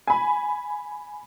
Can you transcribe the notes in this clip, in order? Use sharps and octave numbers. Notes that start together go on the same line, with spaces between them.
G#5 B5